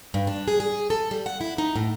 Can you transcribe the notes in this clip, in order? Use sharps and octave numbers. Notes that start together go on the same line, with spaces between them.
G2
D4
G#4
G#4
A4
G3
F#5
E4
D#4
A2